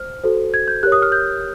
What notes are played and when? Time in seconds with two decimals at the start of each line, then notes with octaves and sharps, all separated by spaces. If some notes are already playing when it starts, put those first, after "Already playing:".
Already playing: C5 F6
0.24 F#4 A4 C5
0.54 G#6
0.68 G6
0.83 G4 A#4 C#5 F#6
0.92 D#6
1.02 F6
1.12 G6